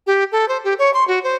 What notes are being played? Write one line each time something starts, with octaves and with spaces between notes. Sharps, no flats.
G4
A4
C5
G4
C#5
C6
F#4
C5